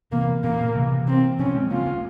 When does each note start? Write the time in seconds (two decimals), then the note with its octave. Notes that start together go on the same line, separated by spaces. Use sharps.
0.12 C3 E3 A#3
0.43 A#2 C#3 A#3
0.75 C3 E3
1.07 C4
1.39 C#3 F3 C#4
1.55 G#3 C4
1.71 A#3 C#4 F4
1.86 A#3 C#4